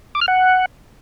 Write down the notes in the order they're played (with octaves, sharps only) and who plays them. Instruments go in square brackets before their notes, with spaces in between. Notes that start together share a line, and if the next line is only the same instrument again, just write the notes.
[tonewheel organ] D6
F6
F#5